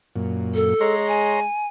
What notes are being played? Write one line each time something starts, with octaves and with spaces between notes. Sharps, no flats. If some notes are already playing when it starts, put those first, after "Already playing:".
F#2 A#2
A4
G#3 C#5 A#5 C6
G#5